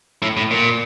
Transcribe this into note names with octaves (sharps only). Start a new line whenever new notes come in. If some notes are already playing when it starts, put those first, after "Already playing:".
A2
A2
A#2